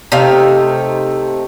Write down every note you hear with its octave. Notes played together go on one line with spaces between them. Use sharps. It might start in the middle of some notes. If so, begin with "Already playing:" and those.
C3 A3 D#4 F5